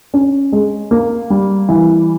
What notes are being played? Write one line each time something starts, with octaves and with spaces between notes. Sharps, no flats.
C#4
G#3
A#3
G3
E3